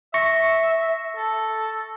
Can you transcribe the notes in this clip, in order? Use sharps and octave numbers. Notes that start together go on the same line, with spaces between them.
E5 C#6 A#6 C#7
A4